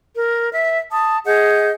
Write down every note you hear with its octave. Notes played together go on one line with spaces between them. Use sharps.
A#4
E5
A5 D#6
G#4 D#5 F#5 G6